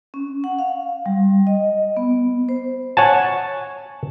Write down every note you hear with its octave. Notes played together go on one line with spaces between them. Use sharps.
C#4
F#5
F5
G3
D#5
B3
C5
C#5 F#5 G#5 A5